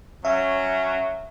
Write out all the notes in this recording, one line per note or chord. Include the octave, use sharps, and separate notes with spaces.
F#3 C#4 E5